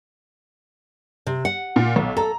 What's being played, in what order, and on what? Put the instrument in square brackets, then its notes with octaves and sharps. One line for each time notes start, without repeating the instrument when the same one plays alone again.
[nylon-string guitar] C3
F#5
[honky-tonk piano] A#2
B1
[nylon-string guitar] A4 [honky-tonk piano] A#5